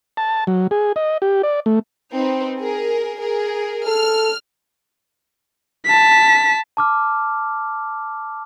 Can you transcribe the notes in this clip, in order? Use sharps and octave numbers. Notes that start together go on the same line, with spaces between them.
A5
F#3
G#4
D#5
G4
D5
A3
C4 D#4 B4
G#4 A#4
G#4 A#4
A4 F6
A5 B6
A5 D6 F6